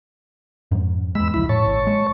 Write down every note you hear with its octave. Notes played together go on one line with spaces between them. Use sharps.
F2 G#2
E2 G#3 B5 E6
E1 C#2 F3 E4 B5
A2 C#5 A5 C#6
G#1
G#3